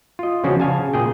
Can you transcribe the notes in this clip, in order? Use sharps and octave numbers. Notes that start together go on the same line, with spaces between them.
F4 D#5
C#3 F3 C#4 D4 F#4
C#3 F5 G#5 A5
A#2 G#4 G5